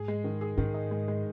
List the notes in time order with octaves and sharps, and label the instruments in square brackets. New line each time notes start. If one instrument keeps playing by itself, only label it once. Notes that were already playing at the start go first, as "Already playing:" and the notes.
Already playing: [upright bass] G#2 [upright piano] G#4
[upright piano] G#3
D#3
G#4
[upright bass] G#2 [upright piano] D#3
[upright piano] D#4
G#3
G#3